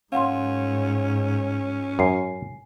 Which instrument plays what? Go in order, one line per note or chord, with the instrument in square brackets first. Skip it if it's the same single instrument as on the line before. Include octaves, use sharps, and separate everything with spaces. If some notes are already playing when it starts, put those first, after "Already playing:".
[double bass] G#2 [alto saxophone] C#4 [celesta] F5 F#5 C6
[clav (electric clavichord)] F#2 [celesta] G#5 C7